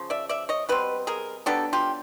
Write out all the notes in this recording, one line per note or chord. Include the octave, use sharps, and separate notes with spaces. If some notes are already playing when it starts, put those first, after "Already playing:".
Already playing: C#3 F3
D5 E5
D5 E5
C#5 D#5
B2 G3 C4 B4
G#4 A#4
F#3 B3 D4 G4 A4
F4 G4